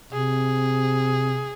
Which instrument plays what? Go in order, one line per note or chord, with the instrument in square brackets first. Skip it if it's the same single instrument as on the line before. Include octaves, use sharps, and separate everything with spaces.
[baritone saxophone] C3 [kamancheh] G#4